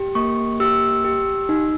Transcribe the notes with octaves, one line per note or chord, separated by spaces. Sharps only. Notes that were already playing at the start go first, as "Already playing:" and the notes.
Already playing: G4
A#3 C#6
G4 E6
G4
D#4